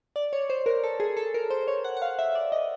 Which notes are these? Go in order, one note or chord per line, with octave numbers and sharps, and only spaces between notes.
D5
C#5
C5
A#4
A4
G#4
A4
A#4
C5
C#5
F#5
F#5
F5
E5
D5
D#5